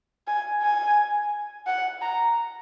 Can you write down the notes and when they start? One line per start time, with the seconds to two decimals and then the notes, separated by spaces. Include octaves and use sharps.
0.28 G#5
0.62 G#5
1.67 F#5
2.01 A#5